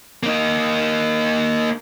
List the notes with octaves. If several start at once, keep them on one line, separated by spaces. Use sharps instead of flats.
A#3 D#4